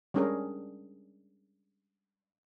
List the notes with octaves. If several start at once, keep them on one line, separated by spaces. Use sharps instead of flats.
G3 G#3 C#4 D4 G#4 A#4